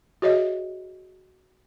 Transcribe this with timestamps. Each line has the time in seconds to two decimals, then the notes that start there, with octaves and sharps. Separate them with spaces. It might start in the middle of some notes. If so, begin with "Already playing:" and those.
0.22 F#4 G#4 C#5 D#5 E5